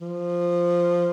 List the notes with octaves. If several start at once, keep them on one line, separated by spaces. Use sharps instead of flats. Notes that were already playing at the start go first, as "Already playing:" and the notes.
F3